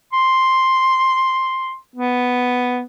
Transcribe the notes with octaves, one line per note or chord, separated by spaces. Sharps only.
C6
B3